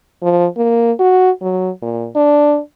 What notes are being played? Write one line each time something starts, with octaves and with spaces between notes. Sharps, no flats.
F3
A#3
F#4
F#3
A#2
D4